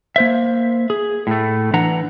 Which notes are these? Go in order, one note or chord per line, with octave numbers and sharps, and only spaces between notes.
A#3 C5 E5
G#4
A2 A3
E3 D4 F#5 A#5